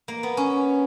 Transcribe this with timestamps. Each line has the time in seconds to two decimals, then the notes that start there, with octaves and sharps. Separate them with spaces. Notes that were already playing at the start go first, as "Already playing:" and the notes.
0.08 A#3
0.23 B3
0.37 C#4